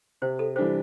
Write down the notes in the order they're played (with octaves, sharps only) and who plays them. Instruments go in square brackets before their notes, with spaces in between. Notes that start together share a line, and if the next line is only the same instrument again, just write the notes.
[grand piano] C3 [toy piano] C5
[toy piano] A4
[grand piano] E3 G3 D4 G4 [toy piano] C5